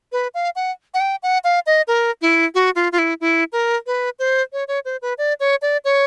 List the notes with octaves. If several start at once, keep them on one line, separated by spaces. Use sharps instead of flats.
B4
F5
F#5
F#5
G5
F#5
F5
D#5
A#4
E4
F#4
F4
F4
E4
E4
A#4
B4
C5
C#5
C#5
C5
B4
D5
C#5
D5
C#5